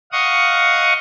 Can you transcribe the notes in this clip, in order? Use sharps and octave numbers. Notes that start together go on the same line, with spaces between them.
D#5 F5 F#5 C#6 D#6